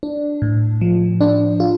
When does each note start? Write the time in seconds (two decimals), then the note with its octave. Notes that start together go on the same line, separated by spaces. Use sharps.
0.03 D4
0.42 A2
0.81 F3
1.21 D4
1.60 F4